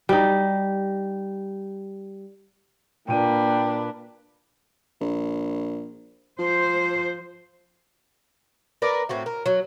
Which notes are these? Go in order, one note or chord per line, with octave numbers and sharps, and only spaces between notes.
G3 D#4
A#2 A#3 D4 B4 G5 D#7
A#1
F3 C5
A#4 B4 D5
A2 C4 F#4
A#4
F#3